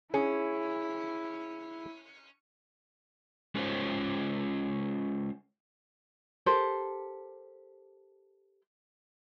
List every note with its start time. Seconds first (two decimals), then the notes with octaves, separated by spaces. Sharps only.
0.14 C#4 E4 G#4
3.55 G#3 C#4 F4 A4 C5 C#5
6.46 G4 A4 A#4 C5